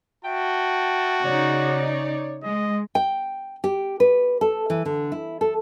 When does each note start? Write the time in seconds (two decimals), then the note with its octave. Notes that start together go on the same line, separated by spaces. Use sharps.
0.25 F#4 E5 G5 A5
1.24 C#3 D#4 C#5 D5
2.43 G#3 D#5
2.95 G5
3.64 G4
4.00 B4
4.41 A4
4.70 E3
4.85 D3
5.12 E4
5.41 A4